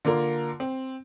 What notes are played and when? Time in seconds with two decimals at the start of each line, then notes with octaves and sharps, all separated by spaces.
0.05 D3 A#3 F4 A#4
0.60 C4